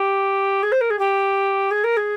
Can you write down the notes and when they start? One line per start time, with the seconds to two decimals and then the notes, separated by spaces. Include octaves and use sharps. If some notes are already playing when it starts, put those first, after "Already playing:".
Already playing: G4
0.63 G#4
0.72 C5
0.81 A#4
0.90 G#4
0.99 G4
1.71 G#4
1.84 A#4
1.97 G#4